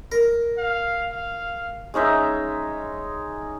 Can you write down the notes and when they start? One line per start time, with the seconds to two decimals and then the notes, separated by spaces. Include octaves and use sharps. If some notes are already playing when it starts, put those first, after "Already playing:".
0.12 A#4
0.57 F5
1.12 F5
1.94 G#3 C#4 D#4 E5